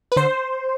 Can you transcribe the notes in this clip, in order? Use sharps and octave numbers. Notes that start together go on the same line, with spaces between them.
B4
D3 C5